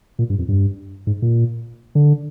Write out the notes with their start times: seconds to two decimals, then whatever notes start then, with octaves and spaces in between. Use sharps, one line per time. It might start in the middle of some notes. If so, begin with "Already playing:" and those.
0.19 A#2
0.30 G2
0.39 F2
0.48 G2
1.07 G#2
1.22 A#2
1.95 D3